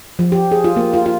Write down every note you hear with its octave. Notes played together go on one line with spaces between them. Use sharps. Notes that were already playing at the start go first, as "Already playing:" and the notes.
F3
G4
G#4
F4
A#3
F4
F4